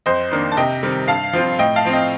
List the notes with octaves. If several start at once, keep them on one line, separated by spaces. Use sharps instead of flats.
F2 C5 D#5
D#3 A#3 D4
A5
C3 D#5 G5
D#3 G3 C4
G2 F5 A5
F3 C4 F4
A2 D#5 G5
F5 A5
F3 C4
D#5 G5